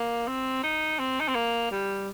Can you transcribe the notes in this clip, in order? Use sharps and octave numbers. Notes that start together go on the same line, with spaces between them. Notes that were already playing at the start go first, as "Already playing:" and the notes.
Already playing: A#3
C4
D#4
C4
D#4
C4
A#3
G3